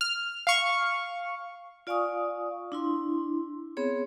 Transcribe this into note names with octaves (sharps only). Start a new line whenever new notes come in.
F6
F5 C#6
F4 D5 F5 G#5 C#6 D#6
D4 E4 C6
B3 C4 G#4 C#5